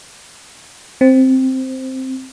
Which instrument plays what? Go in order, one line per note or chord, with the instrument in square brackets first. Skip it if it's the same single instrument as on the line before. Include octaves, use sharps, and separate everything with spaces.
[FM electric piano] C4